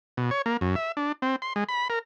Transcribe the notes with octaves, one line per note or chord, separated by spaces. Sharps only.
B2
C#5
A#3
F#2
E5
D4
C4
C6
G#3
B5
A#4